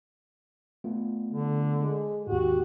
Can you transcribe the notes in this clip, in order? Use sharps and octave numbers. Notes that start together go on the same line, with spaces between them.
A3 B3 F4
D3
G#3
D#2 G#2 F#4 G4